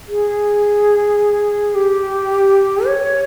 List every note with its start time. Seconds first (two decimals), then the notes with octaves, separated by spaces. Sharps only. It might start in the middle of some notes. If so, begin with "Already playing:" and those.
0.08 G#4
1.75 G4
2.87 C#5